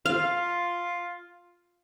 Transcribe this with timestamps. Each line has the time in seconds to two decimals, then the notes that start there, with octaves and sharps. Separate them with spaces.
0.06 F4 F5